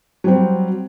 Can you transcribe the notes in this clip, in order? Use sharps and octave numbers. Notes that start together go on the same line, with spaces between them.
F#3 G3 C4